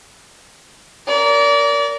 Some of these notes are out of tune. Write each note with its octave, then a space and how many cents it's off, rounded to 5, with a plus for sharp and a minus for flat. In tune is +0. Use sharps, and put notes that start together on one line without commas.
A#4 +0 D5 -30